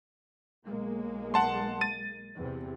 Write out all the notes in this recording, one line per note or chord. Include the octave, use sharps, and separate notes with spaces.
B1 G#3 A#3
F#5 A5 C6
A6 D#7
E2 C3